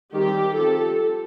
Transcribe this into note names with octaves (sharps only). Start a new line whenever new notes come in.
D#3 G3 C4 G4
F3 C4 A4